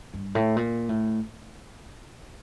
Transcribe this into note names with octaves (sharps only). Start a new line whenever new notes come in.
G2
A2
A#2
A2